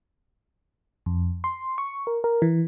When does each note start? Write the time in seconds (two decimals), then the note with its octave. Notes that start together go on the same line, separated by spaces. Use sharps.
1.06 F2
1.44 C6
1.78 C#6
2.07 A#4
2.24 A#4
2.42 E3